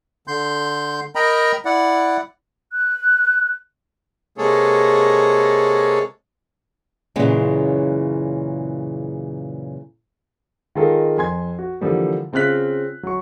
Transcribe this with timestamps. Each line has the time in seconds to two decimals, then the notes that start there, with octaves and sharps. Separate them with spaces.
0.28 D3 C6 G6
1.15 A#4 D#5 G5 A#5 B5
1.65 E4 D5 F#5
2.73 F#6
4.38 C3 G#3 A#3 G#4 A4 C#5
7.16 F#2 A#2 C#3 E3 G#3
10.75 D#3 G#3 F4 A4 A#4
11.17 F2 G#5 C6 G#6
11.59 F#4
11.81 D3 E3 F3 G3 A#3
12.33 C#3 C4 F4 F6 F#6 B6
13.03 F#3 C#6